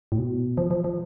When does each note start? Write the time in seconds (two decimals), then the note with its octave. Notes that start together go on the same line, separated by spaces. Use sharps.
0.12 A2
0.19 B2
0.57 F3
0.71 F3
0.84 F3